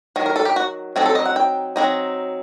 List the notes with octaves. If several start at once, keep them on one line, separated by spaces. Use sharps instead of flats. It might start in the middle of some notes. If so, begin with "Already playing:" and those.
D#3 F#3
A#4
A4
G4
F#4
F#3 C4 D#4 A4
A4
D#5
F#5
G5
F#3 C4 D#4